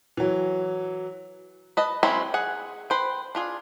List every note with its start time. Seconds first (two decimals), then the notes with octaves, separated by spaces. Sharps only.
0.17 E3 F#3
1.77 B4 D#5 A5
2.03 F#3 G#3 C4 C#4 E4
2.34 G#4 F#5
2.90 B4 C5 G5
3.35 D4 F4 G#4